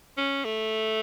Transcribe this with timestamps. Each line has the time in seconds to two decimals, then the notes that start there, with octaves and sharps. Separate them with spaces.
0.17 C#4
0.45 A3